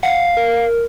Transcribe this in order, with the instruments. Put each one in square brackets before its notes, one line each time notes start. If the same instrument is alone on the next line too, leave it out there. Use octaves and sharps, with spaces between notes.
[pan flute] F5 [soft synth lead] F#5
[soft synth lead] A#4